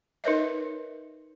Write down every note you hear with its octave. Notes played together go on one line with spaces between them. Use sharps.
D#4 A#4 B4 C#5 D#5 E5